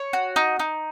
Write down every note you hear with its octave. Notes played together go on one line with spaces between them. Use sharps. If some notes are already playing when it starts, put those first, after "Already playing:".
Already playing: C#5
F#4
D#4
D#4